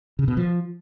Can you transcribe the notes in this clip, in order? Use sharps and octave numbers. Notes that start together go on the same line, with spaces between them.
C#3
B2
F3